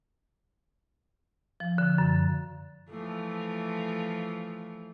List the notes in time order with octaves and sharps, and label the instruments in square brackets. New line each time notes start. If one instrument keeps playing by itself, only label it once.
[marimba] F3
D3
F#2
[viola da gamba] E3 F3 A3